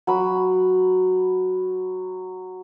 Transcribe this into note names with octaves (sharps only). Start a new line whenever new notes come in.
F#3 B5